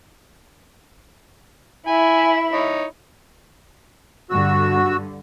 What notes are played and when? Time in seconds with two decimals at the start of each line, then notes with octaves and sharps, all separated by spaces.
1.87 E4 E5 G#5
2.53 D#4 C#5
4.30 G2 D3 F#4 E6